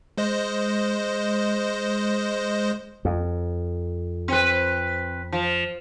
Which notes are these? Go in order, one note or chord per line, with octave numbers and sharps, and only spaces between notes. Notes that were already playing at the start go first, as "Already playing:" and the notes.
G#3 C5 D#5
F2
C4 B4
F3